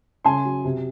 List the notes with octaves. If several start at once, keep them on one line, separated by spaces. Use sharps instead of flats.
C#3 G#5 C6
F#3
C3